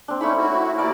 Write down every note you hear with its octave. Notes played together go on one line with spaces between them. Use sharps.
C4 D4
A3 C#4 D#4 E4 C#5 B5
E4 F#4
D#2 E4 A#4 D5 A5